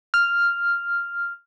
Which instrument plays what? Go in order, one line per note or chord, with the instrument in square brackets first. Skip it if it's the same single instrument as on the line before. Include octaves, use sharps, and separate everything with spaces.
[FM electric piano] F6